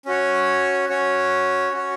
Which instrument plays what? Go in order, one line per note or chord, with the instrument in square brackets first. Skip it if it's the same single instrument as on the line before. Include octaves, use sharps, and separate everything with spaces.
[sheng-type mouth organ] C#4 F#4 C#5
C#4 F#4 C#5
C#4 F#4 C#5